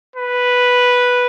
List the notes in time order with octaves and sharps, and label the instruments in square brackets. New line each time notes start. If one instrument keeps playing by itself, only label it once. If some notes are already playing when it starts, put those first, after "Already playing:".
[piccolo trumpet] B4